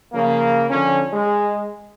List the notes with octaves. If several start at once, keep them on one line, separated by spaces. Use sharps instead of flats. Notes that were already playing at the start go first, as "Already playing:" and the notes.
C#3 F3 A#3
D3 F3 C#4
G#3